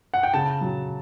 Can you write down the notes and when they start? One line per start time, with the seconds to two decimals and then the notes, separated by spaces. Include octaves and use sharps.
0.14 F#5
0.23 G5
0.34 C#3 A5
0.61 F#3